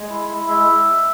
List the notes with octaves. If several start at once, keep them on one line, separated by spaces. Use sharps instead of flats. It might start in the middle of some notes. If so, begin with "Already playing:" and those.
Already playing: G#3
E4
E4
G#3 E5